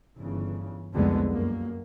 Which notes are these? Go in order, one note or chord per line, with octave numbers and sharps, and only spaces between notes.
G1 C#3 E3
C2 F2 D3 G#3 B3
F#2 A#3